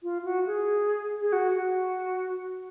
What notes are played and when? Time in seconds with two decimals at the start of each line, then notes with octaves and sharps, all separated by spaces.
0.03 F4
0.25 F#4
0.47 G#4
1.22 G#4
1.33 F#4
1.54 F#4